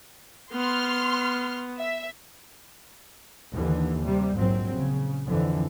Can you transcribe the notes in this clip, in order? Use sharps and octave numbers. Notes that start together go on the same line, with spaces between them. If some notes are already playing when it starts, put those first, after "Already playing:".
B3 C6 F6
E5
D#2 D3 E3
C3 G3
A#1 G#2 F#3 C4
C#3
F2 D3 E3